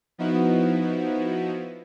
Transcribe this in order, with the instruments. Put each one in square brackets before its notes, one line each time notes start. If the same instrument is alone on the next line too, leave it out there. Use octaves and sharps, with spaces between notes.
[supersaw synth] F3 B3 D#4 E4 F#4